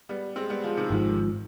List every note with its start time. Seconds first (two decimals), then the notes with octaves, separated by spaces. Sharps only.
0.09 G3 B3
0.36 G#3 C4
0.50 G3 B3
0.64 F3 G#3
0.77 C3 D#3
0.90 G#1 G#2 F3